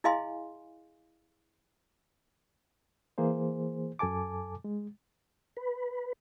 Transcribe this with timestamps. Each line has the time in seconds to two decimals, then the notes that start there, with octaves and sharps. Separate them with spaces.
0.04 E4 G#4 D#5 F5 G#5 C6
3.18 E3 A#3 G#4 C5
3.99 F#2 A4 G#5 A5 D6
4.64 G#3
5.57 B4